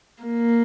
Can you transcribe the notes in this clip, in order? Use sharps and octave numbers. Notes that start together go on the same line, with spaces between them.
A#3